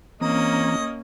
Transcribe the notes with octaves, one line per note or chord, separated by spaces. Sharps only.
E3 A#3 C4 C#4 D#5 A#5